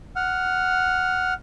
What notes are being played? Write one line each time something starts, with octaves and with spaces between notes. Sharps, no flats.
F#5 F6